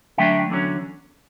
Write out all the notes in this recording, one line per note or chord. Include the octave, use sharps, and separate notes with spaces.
D3 F#3 A3 D4 E5 G5
E2 D3 F#3 C#4